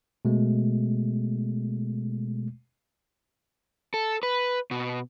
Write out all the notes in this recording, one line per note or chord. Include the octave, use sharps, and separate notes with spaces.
B2 G#3 A3
A4
B4
B2